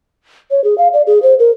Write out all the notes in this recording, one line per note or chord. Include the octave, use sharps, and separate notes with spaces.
C#5
G#4
F5
D5
G#4
C5
A#4